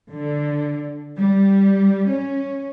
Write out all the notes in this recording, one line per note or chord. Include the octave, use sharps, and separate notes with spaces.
D3
G3
C#4